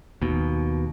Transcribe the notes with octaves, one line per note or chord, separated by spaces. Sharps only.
D#2 B2